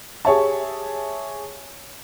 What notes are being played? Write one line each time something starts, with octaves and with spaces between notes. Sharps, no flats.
G4 G#4 C#5 E5 A5